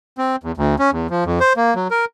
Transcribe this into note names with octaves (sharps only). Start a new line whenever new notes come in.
C4
E2
D2
C#4
E2
F3
F2
C5
A#3
F#3
A#4